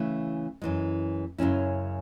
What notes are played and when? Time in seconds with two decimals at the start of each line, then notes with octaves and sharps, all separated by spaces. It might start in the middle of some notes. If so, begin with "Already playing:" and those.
Already playing: C#3 E3 A3 E4
0.62 F#2 E3 G#3
1.38 F#2 C#3 G#3 C#4 E4